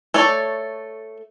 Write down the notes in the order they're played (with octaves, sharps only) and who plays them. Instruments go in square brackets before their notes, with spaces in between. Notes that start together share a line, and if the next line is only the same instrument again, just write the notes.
[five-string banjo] A3 A4 C#5 D5